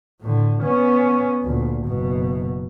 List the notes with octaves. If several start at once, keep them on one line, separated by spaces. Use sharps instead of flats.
A2 D3
B3 C#4
D2 A#2
F#1 B2